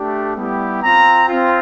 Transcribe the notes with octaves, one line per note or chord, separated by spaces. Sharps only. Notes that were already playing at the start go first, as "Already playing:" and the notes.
Already playing: A3 D4 G4
G3 B3 E4 G4
C4 F4 A#5
C4 F4